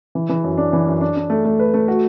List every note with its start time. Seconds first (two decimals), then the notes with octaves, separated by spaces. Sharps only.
0.15 E3
0.29 E3
0.44 F#2
0.58 D4
0.73 E3
0.86 F#2
1.01 D4
1.16 D4
1.30 A3
1.45 A3
1.59 B4
1.74 A3
1.88 F#4